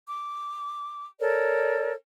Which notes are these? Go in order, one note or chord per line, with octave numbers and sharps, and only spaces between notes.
D6
A4 A#4 C#5 D5